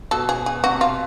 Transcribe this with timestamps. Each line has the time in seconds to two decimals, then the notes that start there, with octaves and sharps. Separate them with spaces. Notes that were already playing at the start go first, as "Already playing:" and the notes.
0.11 B2 A4
0.29 G#4
0.46 G#4
0.64 C3 F#4
0.81 F4